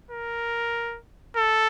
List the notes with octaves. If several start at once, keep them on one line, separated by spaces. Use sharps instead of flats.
A#4
A4